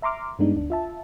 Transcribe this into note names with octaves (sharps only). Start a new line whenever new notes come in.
E5 A#5 C6 D6 F6
G2 G3 G#3 B3 D4 D#4
D2 D4
F4 E5 A5